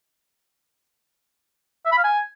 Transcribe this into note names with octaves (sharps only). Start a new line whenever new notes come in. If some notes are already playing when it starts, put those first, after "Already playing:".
E5
B5
F5
G#5